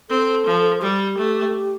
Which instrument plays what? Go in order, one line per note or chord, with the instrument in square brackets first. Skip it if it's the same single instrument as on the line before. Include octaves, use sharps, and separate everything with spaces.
[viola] C4 [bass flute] A4
[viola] F3
[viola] G3 [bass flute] G4
[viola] A3